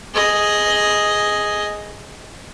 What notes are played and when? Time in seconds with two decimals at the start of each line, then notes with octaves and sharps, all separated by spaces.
0.15 G#4 D#5